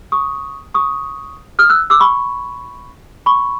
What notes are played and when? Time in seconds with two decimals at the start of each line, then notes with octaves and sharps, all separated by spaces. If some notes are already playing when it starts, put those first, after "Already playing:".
0.12 C#6 D#6
0.74 C#6 D#6
1.59 D#6 F6
1.70 E6 F#6
1.90 D6 E6
2.00 B5 C#6
3.26 B5 C#6